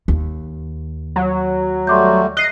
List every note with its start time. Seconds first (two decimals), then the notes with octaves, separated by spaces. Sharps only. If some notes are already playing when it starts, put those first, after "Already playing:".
0.08 D#2
1.16 F#3
1.87 G3 A3 F#4 C6 D6 G6
2.37 D#5 F#6 C7